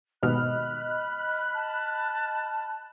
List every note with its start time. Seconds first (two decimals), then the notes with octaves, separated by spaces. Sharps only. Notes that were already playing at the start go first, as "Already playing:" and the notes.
0.23 D#2 G#2 B2 D#5 B5 F6 F#6
1.55 A5